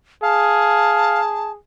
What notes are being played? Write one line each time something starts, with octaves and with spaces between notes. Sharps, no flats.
G#4 F5 A5